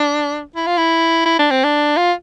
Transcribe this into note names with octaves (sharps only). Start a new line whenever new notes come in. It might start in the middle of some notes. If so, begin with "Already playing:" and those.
Already playing: D4
E4
F4
E4
E4
D4
C4
D4
F4